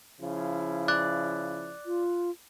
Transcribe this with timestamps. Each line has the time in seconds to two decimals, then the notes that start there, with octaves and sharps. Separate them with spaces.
0.20 C#3 F3 E4
0.88 D5 F#6
1.86 F4